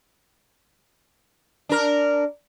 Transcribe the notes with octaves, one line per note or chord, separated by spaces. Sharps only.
D4 A#4